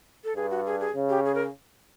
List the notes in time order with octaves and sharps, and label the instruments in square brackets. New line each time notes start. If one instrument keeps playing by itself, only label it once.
[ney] A4
[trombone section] G2 [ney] G#4
[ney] F#4
G#4
G#4
[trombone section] C#3
[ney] G4
G#4
A#4